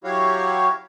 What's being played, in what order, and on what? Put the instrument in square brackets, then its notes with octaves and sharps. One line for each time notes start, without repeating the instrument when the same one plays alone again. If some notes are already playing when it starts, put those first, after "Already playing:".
[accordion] F#3 E4 F#4 G4 C#5 F5